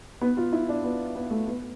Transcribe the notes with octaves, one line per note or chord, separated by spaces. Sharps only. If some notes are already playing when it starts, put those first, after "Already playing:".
B3
F4
E4
D4
B3
B3
A3
B3